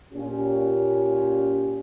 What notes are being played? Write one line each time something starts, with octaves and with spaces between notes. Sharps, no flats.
A#2 C#4 G4